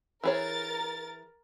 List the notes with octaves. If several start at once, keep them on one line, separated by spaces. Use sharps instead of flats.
E3 G#4 A#4 C#5 A6